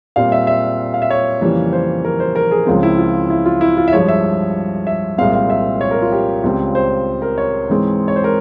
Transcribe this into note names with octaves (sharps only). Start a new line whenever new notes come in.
A#2 G3 C4 F5
E5
E5
F5
E5
C#5
F2 C#3 E3 G3 A#3
C5
A#4
C5
A#4
G#4
C#2 C#3 F3 G#3 C4
E4
F4
E4
F4
E4
F4
E5
G2 F3 G#3 C#5
E5
E5
C2 A#2 G#3 C4 F5
F5
E5
C#5
A#4
F4
G4
C#2 C#3 G3 C4
C5
A#4
C#5
G#2 E3 G#3 C4
C#5
C5
A#4